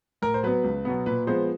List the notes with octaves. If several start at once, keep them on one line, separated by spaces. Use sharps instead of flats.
A2 A#4
C5
F#3 B3 B4
C#2
B2 F#3 B3
A#2 B4
F3 G#3 B3 C5